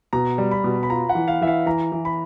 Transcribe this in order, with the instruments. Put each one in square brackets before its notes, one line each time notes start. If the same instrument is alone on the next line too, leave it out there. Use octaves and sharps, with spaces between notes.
[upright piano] B2 [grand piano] A#5
[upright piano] G3
[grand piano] B5
[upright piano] B2
[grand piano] B5
[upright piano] F4 [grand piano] A#5
[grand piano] F#5
[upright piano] E3
[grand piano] F5
[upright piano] E3 [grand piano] E5
[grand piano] F5
[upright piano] E3 [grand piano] A#5
[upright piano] E3
[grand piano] B5